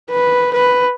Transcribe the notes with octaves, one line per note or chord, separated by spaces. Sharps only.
B4
B4